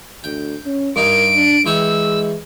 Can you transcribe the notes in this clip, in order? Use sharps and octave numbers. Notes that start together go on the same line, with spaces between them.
D2 G5
C#4
G2 D#4 A#4 D7
D4
E3 G#3 G5 C#6 E6